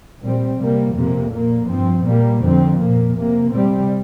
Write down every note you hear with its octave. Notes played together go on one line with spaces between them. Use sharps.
A#2 G3 C4
C3 G3 A#3
F2 C3 A#3
A#2 A#3
G2 F3 C4
A#2 G3 A#3
F2 D3 F3 C4
A#2 A#3
C3 A#3
C3 G3 C4